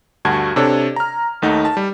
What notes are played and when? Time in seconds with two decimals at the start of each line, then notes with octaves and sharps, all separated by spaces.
0.25 D2 G2 F#4 A5 G#6
0.56 C3 D4 A4 C#5
0.96 A#5 F6
1.42 D#2 A3 D#4 F#5
1.65 A5
1.77 G3